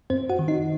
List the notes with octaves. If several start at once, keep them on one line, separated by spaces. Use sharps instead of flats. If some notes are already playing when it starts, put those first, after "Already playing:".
F#2 C4 C5
F#4 F#5
D#3
D#4 D#5